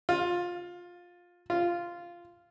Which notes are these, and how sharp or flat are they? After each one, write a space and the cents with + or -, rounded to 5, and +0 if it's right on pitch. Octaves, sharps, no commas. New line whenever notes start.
F4 +15
F4 -10